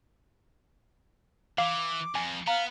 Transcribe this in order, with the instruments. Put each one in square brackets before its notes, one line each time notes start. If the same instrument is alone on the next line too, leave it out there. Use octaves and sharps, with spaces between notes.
[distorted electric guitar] E3 [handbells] F5 [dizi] D6
[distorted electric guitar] F2 [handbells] G#5
[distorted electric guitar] B3 [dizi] F5 [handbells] A#5